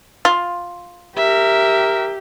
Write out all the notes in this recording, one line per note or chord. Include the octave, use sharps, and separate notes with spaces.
F4
G4 A#4 E5